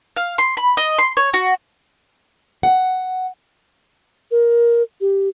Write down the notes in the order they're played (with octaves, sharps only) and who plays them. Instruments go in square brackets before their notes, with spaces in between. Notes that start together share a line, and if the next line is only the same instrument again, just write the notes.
[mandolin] F5
C6
B5
D#5
C6
C#5
F#4
[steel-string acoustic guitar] F#5
[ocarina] A#4
G4